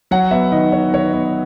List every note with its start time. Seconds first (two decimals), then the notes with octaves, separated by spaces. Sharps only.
0.11 F#3 F#5
0.31 B3 E5
0.52 D#3 D#5
0.72 D#3 C#5
0.92 D#3 C#5
1.03 B4
1.13 B3